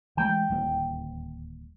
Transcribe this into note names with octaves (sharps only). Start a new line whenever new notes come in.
E3 G#3 A3 G5
D1 D#2 G3